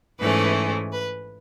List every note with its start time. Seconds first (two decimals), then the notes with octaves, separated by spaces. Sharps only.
0.19 G#2 E3 A3 C#4 B4
0.92 B4